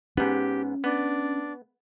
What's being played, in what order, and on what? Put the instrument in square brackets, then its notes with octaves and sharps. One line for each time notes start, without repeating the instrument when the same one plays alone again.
[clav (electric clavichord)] G#2 B3 [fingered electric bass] C#4 [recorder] G4
[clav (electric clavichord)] B3 [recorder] D4